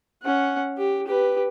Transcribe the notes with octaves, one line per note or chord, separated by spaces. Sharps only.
C#4 F#5
G4
G4 B4